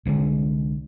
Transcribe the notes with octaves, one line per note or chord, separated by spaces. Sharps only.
C2 D3 D#3 G#3